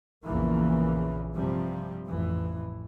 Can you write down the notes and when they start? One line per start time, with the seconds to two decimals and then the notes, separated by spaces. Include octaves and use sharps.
0.26 A#1 E2 C#3 E3 A#3
1.34 G2 C3 F3 G3
2.07 A1 F2 E3